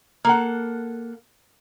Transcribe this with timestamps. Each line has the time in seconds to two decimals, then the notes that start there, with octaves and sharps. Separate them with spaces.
0.25 A#3 A4 F#5